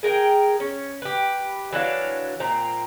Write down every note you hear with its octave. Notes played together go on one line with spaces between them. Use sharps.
G#4 A#4 F#5 G5
C#4
G4 B4
E3 F#3 D4 F5
A#2 C4 A#5